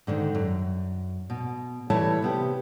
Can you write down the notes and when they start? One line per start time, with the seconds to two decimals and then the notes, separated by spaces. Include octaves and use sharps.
0.07 G#2 D3 D#3
0.35 F#2
1.30 B2
1.90 E3 G3 A3 E4 C#5 A5
2.22 C3 B3 G4